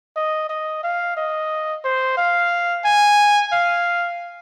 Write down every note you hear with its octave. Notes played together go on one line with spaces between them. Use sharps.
D#5
D#5
F5
D#5
C5
F5
G#5
F5